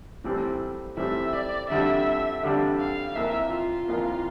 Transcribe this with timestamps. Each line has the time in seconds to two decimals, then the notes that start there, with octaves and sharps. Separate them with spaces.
0.24 A2 E3 G3 C4
0.97 A2 E3 G3 C4 E5
1.33 D5
1.70 F2 D3 G3 D4 E5
2.43 F2 D3 G3 D4
2.79 F5
3.15 F2 E3 A#3 E5
3.52 F4
3.88 F2 E3 A#3